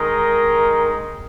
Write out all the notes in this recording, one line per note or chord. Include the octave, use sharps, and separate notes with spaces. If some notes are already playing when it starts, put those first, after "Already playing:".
Already playing: D#3 G#3 D#4 A#4